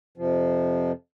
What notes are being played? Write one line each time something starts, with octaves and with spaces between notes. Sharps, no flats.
F2 C3 F3